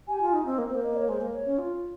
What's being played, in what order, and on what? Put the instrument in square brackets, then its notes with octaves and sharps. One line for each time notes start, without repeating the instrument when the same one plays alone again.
[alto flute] G4 [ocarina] G#5
[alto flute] F4
[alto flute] D#4 [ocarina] D#5
[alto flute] C4
A#3
C4
[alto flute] A#3 [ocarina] C5
[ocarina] D#5
C#5
[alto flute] G#3 [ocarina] C5
[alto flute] A#3
[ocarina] C#5
[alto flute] C#4
F4